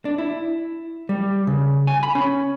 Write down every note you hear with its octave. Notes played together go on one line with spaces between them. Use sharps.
D4
E4
G3
C#3
G#5
B5
C#4